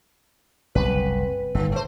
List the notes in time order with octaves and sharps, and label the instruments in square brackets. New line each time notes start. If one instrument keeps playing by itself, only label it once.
[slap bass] F#1 C2 B2 [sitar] B4
[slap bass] G1 A2 [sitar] D#3
[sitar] A3 C5